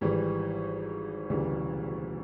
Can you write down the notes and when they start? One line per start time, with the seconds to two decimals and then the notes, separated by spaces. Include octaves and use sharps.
0.01 G#1 G#2 E3 G3
1.29 E1 D2 C#3 E3 G3